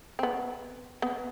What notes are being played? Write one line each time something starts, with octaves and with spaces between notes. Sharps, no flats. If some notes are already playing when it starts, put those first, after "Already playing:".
C4
B3
B3